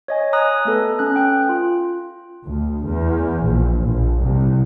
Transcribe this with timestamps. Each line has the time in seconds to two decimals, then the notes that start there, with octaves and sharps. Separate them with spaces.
0.08 C#5 D#5 G#5
0.33 A#5 D#6 F#6
0.65 A3 B3 A4 B4
0.99 C#4 F#6
1.16 G5 F#6
1.49 F4
2.44 D2
2.85 E2
3.42 A#1
3.81 A#1
4.20 C2